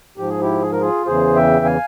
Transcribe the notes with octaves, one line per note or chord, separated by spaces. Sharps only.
G#2 F3 G4
G#4
E4 G4
G#4
A#4
F4 G#4
E2 C#3 E3 G#4 C5
E5 G5
F5 G#5